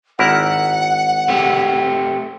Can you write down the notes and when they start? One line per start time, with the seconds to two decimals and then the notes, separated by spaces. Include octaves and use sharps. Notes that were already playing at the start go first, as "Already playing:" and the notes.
0.19 G#1 E4 A#4 F#5
1.28 A3 C4 G4